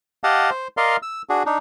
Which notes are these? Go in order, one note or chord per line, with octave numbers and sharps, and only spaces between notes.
G4 D#5 F5 F#5 A5
C5
A#4 D5 D#5 F5 C6
E6
D4 F#4 G#4
D4 D#4